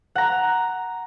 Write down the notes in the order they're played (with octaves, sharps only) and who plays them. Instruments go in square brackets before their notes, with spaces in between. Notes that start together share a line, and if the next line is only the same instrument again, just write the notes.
[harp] F#5 A#5